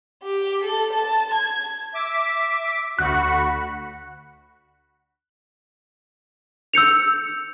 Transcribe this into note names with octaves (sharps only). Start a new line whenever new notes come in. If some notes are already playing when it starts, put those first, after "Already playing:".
G4
A4
A5
G#6
E5 D6 B6
D2 F#4 B5 F#6 C#7
E6 G6 C#7 F7